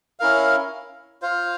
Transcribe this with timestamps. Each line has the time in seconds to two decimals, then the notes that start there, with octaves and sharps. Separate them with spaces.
0.20 C#4 E4 A#4 F5
1.22 F4 C5 F5